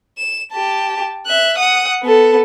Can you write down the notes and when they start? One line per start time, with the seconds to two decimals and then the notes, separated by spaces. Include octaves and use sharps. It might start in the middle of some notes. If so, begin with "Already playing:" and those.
0.18 E7
0.52 G4 A5
1.27 E5 F#6
1.58 F#5 D#6
2.03 B3 A4